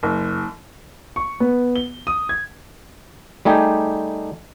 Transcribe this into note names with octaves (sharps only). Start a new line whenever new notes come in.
F#1
C#6
B3
G7
D#6
G#6
G3 A3 D#4 G4 G#4